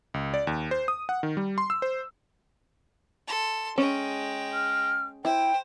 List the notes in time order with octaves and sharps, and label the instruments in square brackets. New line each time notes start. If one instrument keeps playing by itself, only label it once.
[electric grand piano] C#2
D5
D#2
C5
D#6
F#5
D#3
G3
C6
E6
C5
[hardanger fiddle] A4 C6
[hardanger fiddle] G#3 G5 [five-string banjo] C#4
[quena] F6
[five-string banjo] E4 [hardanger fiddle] C5 [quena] G5